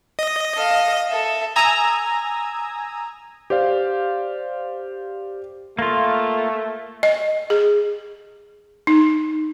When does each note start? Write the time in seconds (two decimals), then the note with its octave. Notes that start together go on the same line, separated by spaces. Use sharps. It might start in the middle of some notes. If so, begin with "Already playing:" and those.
0.19 D#5
0.55 A4 F5
1.08 A4 E5
1.56 G#5 A#5 D#6 E6 G#6
3.50 G4 C5 D5 F5
5.79 A3 A#3 F4
7.03 D#5
7.50 G#4
8.87 D#4